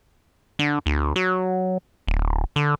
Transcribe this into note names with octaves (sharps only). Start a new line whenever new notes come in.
D3
D2
F#3
D1
D3